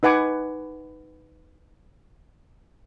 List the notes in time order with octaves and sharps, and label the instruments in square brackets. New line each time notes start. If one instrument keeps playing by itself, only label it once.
[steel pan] D#4 B4 F#5 G#5 D6